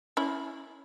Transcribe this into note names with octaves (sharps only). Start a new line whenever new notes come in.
C#4 E4